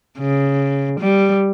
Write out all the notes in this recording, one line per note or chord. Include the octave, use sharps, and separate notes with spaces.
C#3
G3